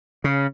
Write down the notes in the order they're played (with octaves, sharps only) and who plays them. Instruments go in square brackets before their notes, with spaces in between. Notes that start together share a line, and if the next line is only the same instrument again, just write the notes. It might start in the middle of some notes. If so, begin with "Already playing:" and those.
[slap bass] C#3